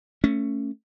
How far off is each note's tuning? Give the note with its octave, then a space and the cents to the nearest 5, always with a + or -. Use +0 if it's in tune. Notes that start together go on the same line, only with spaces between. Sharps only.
A3 +20 C#4 +0